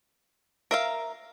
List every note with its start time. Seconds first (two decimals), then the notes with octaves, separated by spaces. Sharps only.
0.71 A#4 E5 F5